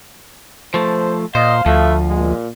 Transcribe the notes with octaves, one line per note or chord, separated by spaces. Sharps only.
F3 A3 C5
A#2 C5 D#5 F5
D2 F3 A3
A#2 G#3